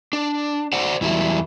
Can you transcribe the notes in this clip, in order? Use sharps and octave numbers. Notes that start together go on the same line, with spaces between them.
D4
C5 D5 F#5
E2 E3 F#3 G3 E4